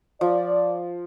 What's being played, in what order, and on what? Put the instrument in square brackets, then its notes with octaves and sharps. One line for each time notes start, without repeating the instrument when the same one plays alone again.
[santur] F3 [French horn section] D5